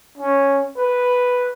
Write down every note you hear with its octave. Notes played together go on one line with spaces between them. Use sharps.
C#4
B4